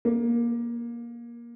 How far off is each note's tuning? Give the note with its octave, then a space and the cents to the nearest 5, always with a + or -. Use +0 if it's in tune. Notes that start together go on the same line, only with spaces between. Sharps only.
A#3 +20